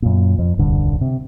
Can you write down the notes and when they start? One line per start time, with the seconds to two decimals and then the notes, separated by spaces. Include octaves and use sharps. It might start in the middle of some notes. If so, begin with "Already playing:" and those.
0.02 F#2 A#2
0.39 F2
0.58 D#1 C2 G2 D3
1.01 C3